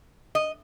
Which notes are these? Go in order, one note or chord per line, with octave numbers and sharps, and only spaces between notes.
D#5